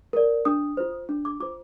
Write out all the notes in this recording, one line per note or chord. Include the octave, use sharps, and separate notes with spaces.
A#4 D5
D4 D#6
F4 C5
D4
D6
F4 C5 D6